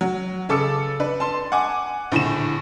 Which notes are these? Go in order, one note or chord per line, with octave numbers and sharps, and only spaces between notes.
F#3
C#3 A4 D6 E6 C#7
D4 B4
A5 C6
F#5 G#5 D6
A#1 A2 D3 E7